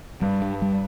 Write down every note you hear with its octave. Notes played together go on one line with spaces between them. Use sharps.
G2 G3
G2
G3